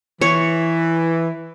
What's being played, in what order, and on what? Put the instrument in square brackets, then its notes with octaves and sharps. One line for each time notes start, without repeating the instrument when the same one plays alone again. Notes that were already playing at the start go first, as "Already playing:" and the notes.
[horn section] E3 [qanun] C#5